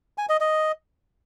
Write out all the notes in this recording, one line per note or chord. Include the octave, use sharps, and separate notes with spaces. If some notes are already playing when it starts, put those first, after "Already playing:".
G#5
D#5
D#5